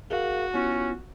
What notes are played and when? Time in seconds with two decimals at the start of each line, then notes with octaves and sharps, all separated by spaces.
0.11 F#4 G#4 A#4 F5
0.54 B3 C#4 E4 F4